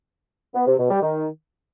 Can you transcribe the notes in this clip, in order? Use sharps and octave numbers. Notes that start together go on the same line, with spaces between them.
B3
C3
B2
G3
D#3